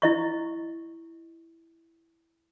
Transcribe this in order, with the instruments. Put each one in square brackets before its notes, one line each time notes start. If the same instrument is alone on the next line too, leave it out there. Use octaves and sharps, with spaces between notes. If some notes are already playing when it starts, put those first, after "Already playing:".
[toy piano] E4 D#5 C#6